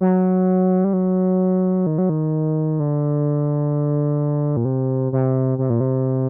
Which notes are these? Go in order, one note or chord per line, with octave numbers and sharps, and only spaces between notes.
F#3
G3
F#3
D#3
F#3
D#3
D3
A#2
C3
C3
C3
A#2
C3